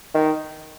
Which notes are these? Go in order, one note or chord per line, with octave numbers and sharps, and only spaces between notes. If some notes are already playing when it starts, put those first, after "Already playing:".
D#3